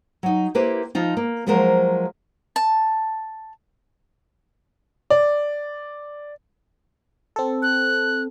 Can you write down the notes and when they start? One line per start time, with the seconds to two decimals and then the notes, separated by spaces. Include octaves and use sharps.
0.23 F#3 D#4
0.55 A#3 E4 G4 B4 C5
0.95 F3 D#4 F4
1.17 A#3
1.47 F3 F#3 G#3 A#3 A#4 C5
2.56 A5
5.10 D5
7.36 C4 A4
7.62 F#6